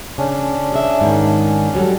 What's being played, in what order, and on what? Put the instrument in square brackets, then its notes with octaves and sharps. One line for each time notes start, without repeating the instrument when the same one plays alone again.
[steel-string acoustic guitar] C#3 [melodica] C#4 D4
[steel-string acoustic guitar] G#4 D#5 E5
G#2 D#3
F#3 G3 A4